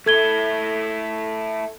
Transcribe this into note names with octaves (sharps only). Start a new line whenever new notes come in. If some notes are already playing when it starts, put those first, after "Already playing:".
A3 E4 A4 G#6 G7